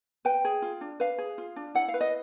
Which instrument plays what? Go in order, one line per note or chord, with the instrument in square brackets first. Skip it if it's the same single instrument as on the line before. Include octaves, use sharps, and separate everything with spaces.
[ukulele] B4 G5
G#4
F4
D4
B4 F5
G#4
F4
D4
E4 F#5
F5
B4
D#5